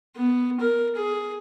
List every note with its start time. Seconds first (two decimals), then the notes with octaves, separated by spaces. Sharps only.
0.15 B3
0.60 A#4
0.95 G#4